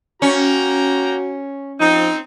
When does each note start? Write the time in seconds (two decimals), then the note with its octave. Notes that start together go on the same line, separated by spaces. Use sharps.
0.22 A#3 C#4 F#4 G5 A#5
1.80 F3 C4 D#4